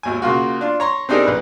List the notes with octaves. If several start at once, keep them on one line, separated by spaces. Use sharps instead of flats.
G#1 D#2 G#5
C#3 A#3 F4 F#4
D4 F4
C#5 A#5 C6
C4 D4 D#4 G4 G#4 A#4
A#1 B4